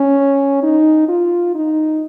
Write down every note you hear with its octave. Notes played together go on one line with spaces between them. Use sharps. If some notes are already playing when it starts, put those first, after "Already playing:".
Already playing: C#4
D#4
F4
D#4